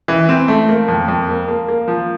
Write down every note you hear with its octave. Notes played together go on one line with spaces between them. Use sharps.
E3
C4
A3
A#3
F2
F2
A#3
A#3
A#3
F3